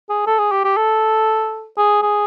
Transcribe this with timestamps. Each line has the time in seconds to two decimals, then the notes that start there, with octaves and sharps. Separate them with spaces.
0.09 G#4
0.26 A4
0.39 G#4
0.51 G4
0.64 G4
0.77 A4
1.78 G#4
2.02 G#4